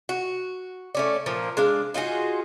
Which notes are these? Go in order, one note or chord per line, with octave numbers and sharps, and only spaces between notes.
F#4
A3 C#4 D5
A#2 F3 A#3
G#3 D4 F5
D#4 F4 F#4 G#4